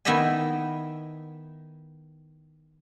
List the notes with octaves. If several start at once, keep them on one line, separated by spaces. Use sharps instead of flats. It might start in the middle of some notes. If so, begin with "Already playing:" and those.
D#3 B3 E4 D#5 E5 G#5